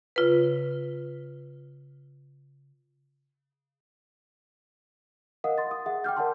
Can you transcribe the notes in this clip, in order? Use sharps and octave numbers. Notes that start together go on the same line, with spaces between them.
C#3 F4 B4
A#4 D#5 F5 F#5 D#6
C6 A6
D#6
G#4 E5 F#5
G5 D6 F6 G6
A#4 D5 F#5 G5 A5 C6